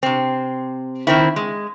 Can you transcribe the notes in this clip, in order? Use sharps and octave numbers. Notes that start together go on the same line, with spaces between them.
C3 C4
D#3 C4 E4
G#3